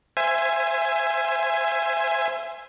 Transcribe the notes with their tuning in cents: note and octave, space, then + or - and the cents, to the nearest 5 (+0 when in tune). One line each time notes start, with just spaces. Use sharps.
C5 +0 E5 +25 G#5 -5